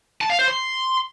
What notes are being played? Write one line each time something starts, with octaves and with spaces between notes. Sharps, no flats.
A5
F5
C5
C6